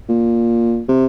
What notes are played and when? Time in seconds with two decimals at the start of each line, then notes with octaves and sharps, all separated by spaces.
0.09 A#2
0.89 C3